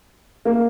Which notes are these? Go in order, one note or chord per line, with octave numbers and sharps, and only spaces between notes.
A#3